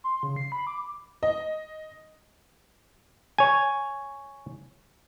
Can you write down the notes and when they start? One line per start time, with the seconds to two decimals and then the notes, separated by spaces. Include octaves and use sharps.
0.04 C6
0.23 C#3
0.36 C7
0.52 B5
0.67 D6
1.23 D#5
3.38 C#5 G#5